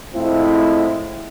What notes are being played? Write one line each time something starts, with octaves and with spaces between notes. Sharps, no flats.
A2 F3 G#3 C4 E4